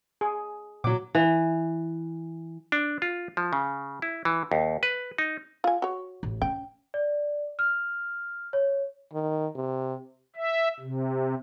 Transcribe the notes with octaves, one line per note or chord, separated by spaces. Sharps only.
G#4
A#2 F#3 D6
E3
D4
F4
F3
C#3
E4
E3
D#2
B4
D#4
F4 G#5
F#4 C#5
A1
C#4 G5
D5
F6
C#5
D#3
C3
E5
C3